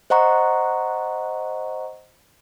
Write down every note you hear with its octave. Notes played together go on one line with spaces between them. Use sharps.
C5 D#5 F#5 A#5 C#6